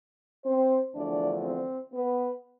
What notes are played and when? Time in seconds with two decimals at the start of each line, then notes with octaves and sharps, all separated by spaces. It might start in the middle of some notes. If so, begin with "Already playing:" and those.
0.45 C4 C5
0.94 E2 D3 F3 A3 D4 D5
1.44 C4 C5
1.93 B3 B4